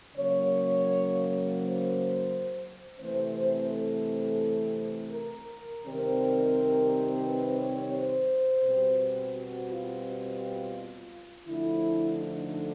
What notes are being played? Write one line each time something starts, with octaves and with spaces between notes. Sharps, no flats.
C#3 F#3 A#3 C#5
C5
C3 E3 A3 C4 C5
C5
A4
A#4
C3 D#3 G3 C4
B4
C#5
C5
B2 G3 C4
F#4
F4
D3 F3 A3 E4
D#4